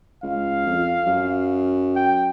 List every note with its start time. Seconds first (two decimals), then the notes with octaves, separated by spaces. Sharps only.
0.23 C#2 F5
0.66 F2
1.07 F#2
1.96 G5